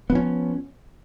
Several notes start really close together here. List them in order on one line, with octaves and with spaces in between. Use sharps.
B3 F3 C#4